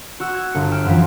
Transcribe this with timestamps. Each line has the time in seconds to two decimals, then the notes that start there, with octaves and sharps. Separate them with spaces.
0.20 F#4 E6
0.35 G#6
0.52 G1 C#7
0.72 G5 F6 E7
0.85 F#2 E3 F3 F4 B6